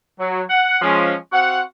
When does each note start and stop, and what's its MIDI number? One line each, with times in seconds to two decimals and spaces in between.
0.20 0.42 54
0.50 0.81 78
0.81 1.15 53
0.81 1.15 56
0.81 1.15 61
1.32 1.61 60
1.32 1.61 66
1.32 1.61 77
1.32 1.61 78